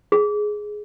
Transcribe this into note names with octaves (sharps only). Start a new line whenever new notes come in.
G#4